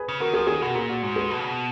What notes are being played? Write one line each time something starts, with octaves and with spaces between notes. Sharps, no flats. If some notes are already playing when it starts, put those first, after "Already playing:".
Already playing: G#4 B4
C#3
D#3 F#4 A#4
F3 G#4
D#3 G#4
B2 F#4 A#4
A#2 G#4
F#4
G#2 F#4
G#4 B4
B2
C#3
B2